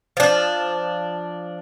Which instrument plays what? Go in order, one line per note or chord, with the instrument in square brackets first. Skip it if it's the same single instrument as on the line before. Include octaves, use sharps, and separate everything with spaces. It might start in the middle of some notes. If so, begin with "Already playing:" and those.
[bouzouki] F3 D4